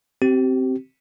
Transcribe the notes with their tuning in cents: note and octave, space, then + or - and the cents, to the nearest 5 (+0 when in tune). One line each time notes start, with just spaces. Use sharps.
C4 +0 G4 -35